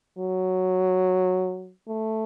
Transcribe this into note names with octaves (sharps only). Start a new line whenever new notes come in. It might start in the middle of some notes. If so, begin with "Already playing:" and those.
F#3
A3